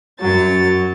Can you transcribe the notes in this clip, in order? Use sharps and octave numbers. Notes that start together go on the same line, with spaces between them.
F#2 F#3 C#5 A6